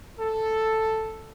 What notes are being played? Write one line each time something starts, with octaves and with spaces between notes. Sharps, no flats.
A4